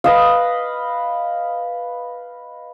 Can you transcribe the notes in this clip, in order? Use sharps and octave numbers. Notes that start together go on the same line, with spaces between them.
B4 D#5 F5